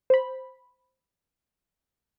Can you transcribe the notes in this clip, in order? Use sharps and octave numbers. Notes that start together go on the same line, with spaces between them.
C5 B5